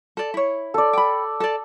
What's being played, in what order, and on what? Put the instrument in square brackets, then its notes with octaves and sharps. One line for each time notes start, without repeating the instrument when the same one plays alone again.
[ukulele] A4 D5
E4 C#5
[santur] A4 D5
[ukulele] G5 B5
A4 D5